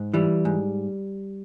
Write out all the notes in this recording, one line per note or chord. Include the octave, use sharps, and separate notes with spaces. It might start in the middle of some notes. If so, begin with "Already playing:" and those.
Already playing: G#2
E3 G3
G#2